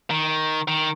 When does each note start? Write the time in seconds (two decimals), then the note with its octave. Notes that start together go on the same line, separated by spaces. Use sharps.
0.10 D#3
0.68 D#3